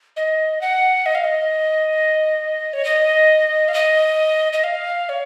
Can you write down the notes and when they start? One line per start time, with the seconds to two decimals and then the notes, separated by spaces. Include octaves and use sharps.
0.16 D#5
0.61 F#5
1.06 D#5
1.15 F5
1.24 D#5
2.73 C#5
2.85 D#5
3.68 F5
3.74 D#5
4.53 D#5
4.64 F5
5.09 C#5